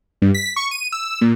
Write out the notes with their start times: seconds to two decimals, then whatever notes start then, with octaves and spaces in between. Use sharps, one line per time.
0.22 G2
0.34 B6
0.56 C#6
0.71 D#7
0.92 E6
1.21 A#2